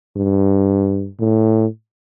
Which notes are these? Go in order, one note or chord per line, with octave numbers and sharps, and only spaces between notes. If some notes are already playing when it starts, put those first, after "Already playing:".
G2
A2